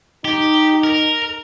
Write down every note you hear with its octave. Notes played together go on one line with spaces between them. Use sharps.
D#4 G4
A#4